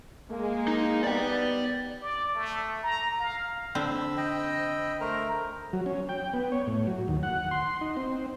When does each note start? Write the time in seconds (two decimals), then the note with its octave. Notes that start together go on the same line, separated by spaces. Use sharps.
0.30 G#3 A#3
0.68 D#4
1.04 B3 D5 G5
2.02 D5
2.35 A3
2.83 A#5
3.20 F5
3.75 D3 C4 B5 E6
4.17 D#5 G5
5.01 A3 A#4 C5 A#5
5.73 F#3
5.86 C#4
6.09 G5
6.33 B3
6.52 C#5
6.67 A2
6.87 F#3
7.08 D#2
7.23 F#5
7.51 C6
7.81 D#4
7.96 C4